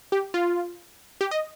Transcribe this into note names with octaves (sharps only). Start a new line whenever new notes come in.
G4
F4
G4
D#5